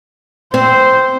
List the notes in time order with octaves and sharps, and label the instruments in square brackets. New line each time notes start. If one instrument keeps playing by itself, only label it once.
[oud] C4 [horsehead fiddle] C5